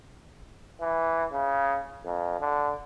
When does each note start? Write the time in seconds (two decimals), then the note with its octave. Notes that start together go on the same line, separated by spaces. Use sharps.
0.81 E3
1.32 C#3
2.06 F2
2.40 D3